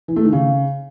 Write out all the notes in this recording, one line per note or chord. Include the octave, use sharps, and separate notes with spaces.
E3
A3
D#3
C#3